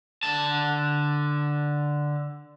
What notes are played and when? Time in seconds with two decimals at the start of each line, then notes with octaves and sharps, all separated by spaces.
0.23 D3 A5